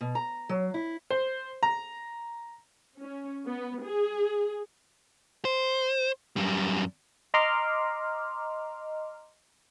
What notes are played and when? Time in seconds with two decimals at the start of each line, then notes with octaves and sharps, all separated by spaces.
0.01 B2
0.15 A#5
0.49 F#3
0.74 E4
1.11 C5
1.63 A#5
2.98 C#4
3.45 B3
3.82 G#4
5.45 C5
6.36 F#2 G3
7.34 D#5 A#5 C6 D6 F6